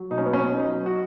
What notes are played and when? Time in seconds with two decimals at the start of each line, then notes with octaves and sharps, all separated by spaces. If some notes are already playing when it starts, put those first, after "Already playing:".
Already playing: F#3
0.10 B2 D#4
0.18 C#4
0.26 B3
0.33 C#4
0.39 B2
0.53 D#4
0.68 F#3
0.86 F#4